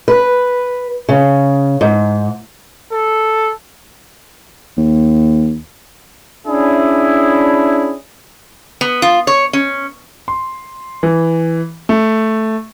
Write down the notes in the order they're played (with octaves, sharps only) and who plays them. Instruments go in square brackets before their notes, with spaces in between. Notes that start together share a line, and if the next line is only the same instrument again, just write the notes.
[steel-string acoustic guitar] B4
C#3
G#2
[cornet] A4
[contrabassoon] D#2
[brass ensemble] C#4 D4 E4 G#4
[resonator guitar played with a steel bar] B3
F4
C#5
C#4
[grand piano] C6
E3
A3